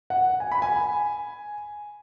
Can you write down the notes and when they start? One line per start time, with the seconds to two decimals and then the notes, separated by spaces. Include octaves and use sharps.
0.10 F#5
0.40 G#5
0.52 B5
0.62 G#5